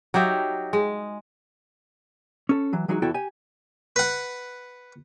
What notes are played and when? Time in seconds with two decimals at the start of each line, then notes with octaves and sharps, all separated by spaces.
0.14 F#3 D#4 G4 E5
0.73 G#3
2.49 C#4 A4
2.73 E3 F#3
2.88 E3 F#3 G#3 D#4 F#4
3.02 E2 E4 F#4 A4 G5
3.14 G4 G#5
3.96 B4 F#5